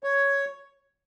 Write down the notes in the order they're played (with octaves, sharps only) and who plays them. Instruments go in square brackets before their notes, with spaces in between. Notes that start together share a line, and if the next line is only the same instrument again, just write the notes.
[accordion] C#5